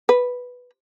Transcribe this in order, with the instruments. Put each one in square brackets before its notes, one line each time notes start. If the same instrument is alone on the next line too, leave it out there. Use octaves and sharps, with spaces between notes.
[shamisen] B4